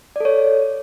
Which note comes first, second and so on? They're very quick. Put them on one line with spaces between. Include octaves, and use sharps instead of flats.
D5 A4 C#5